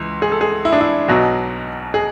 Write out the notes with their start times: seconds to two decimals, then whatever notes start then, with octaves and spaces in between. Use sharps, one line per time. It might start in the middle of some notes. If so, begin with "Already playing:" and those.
Already playing: C#2 E3
0.22 G#4
0.32 A4
0.41 G#4
0.65 E4
0.73 D4
0.81 E4
1.08 B1 B2 F#3 F#4
1.94 G#4